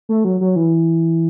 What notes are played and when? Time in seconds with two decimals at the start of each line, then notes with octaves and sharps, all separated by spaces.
0.09 A3
0.25 F#3
0.41 F#3
0.56 E3